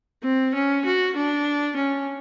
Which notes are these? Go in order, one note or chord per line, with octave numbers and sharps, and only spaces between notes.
C4
C#4
F#4
D4
C#4